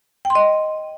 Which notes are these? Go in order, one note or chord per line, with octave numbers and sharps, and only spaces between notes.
G5
C6
D#5